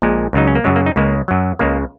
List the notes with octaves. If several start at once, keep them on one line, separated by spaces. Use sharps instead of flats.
A#1 A#2 G#3
C#2 C#3 F#3 D#4
C#4
A#3
F#2 C#3 F#3 G#3
A#3
D#4
C#2 C#3 G#3 A#3
F#2 F#3
C#2 C#3 G#3 A#3